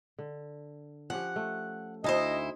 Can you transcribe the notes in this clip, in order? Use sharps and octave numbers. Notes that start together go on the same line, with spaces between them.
D3
F3 C#4 G4 F#5
A3
D2 D#4 E4 C5 D#5